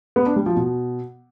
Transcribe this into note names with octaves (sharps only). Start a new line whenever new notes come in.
B3
D4
G3
F3
B2